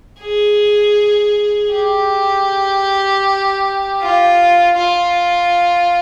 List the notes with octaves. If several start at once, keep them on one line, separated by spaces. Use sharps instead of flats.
G#4
G4
F4
F4